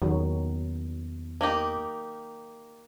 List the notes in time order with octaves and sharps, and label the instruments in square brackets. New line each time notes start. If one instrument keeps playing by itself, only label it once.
[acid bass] E2 [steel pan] D#3 F#3
[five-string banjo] A#3 D#4 G4